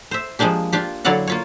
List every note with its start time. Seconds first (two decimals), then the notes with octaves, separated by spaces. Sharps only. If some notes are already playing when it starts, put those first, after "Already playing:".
0.11 C5 E5
0.39 F3 G#3 A#3 D4 G4
0.72 D4 F4 G4
1.05 D3 F#3 E4 D5 F5 F#5
1.27 A#3 F4 C#5